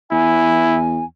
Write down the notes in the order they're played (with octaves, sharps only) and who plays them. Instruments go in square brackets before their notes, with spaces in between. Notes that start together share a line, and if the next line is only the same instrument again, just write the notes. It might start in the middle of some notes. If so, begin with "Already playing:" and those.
[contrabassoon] E2 [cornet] E4 [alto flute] G#5